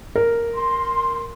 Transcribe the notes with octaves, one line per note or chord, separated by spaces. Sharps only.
A#4
C6